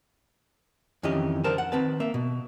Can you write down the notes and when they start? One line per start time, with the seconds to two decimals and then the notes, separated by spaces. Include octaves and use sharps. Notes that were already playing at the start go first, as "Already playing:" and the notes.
1.03 F2 D#3 E3 C#4 G4 D#5
1.44 D3 F3 A#4 C5 A5
1.58 F#5
1.72 D#3 C4 B4 A5
2.00 A#3 E5
2.14 B2